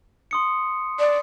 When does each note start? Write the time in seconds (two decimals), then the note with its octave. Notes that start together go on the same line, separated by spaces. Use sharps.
0.31 C6 D#6 C#7
0.99 D5